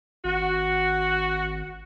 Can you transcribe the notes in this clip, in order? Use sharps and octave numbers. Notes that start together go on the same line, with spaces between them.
G#1 F#4